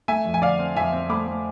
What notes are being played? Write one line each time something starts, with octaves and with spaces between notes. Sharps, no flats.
A3 E5 G#5
F2
G#5
D3 D5 F5
C4
F2 E5 G#5
C4
A3 B5 D6
A3